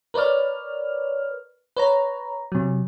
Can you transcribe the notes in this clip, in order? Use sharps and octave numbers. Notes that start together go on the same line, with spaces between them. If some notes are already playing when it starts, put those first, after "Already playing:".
A#4 B4 C#5 D5 F6
B4 C#5 A#5
C3 F#3